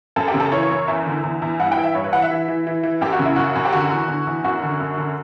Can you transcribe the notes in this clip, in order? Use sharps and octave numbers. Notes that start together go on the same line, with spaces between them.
F#2 A4
G4
C#3
A4
E3 C#5
F#2
E2 E5
D3
E2
E2
G2 F#5
G5
E3
E5
G2 C#5
B4
E3 F#5
E5
E3
E3
E3
E3
F#2 G4
F#4
C#3
E4
F#2 F#4
F#2
G4
D3 F#4
E2
D3
E2
F#2 F#4
D3
F#2
D3